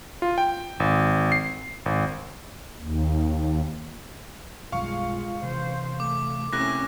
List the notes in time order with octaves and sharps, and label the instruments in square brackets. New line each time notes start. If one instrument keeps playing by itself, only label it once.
[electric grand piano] F4
G5
G#1
C7
G#1
[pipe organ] D#2
[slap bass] B1 F#2 G3 [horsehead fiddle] G#3 F4 [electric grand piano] F5 C#6
[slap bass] C3 E3 [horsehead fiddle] C5
[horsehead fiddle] A3 [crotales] D6
[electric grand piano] C3 A3 E4 [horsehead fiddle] A#3 C#4 [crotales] F#6 A#6